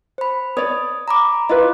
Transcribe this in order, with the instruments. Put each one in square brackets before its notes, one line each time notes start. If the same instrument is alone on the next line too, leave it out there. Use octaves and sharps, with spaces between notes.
[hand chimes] C5 B5
[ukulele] C#5 D5 [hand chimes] D#6
[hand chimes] A#5 B5 D6
[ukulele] E4 F4 B4 [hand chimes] D#5 F5